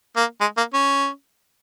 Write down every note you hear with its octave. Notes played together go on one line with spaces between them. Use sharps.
A#3
G#3
A#3
C#4